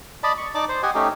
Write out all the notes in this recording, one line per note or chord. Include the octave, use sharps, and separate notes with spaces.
D5 D#5 A5 B5
C#6
D#4 D5 A5 D6
C5
G4 D#5 F#5 G#5
A3 C#4 D#4 G4